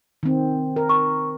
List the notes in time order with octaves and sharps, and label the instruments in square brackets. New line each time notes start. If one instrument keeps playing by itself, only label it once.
[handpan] D#3 C4
A#4
[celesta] C#6